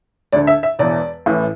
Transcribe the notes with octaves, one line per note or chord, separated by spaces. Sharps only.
D2 D3 D5
E5
E5
E1 E2 E3 D5
A1 A2 E3